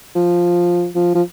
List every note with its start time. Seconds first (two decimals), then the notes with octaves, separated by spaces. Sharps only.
0.15 F3
0.95 F3
1.15 F3